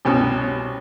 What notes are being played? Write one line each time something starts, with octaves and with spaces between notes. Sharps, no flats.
C2 B2 C#4